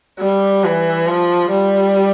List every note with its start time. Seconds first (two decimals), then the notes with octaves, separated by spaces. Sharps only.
0.19 G3
0.64 E3
1.06 F3
1.51 G3